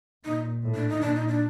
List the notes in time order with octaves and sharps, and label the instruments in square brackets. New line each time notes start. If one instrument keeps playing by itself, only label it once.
[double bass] A#2 [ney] D#4
[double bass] A2
[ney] D4
D#4
[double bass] A#2 [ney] D4
[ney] D#4
D4